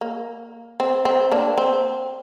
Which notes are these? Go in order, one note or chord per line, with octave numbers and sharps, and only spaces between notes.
A#3
C4
C4
A#3 D4
C4